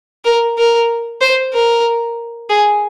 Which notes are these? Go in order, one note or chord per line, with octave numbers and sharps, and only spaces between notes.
A#4
A#4
C5
A#4
G#4